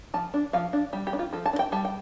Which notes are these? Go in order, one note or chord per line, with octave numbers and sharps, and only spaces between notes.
F3 A5
D4
F3 F5
D4
G3 G4
G4
D4
F4
F3 A4
A5
D4
G5
G3 A5
G5